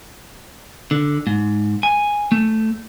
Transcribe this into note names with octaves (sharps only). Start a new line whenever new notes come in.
D3
G#2
G#5
A3